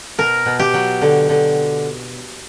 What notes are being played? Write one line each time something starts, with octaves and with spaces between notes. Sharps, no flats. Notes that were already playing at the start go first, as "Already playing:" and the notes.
B2 A#4
B2
G4
F#3
D3
D3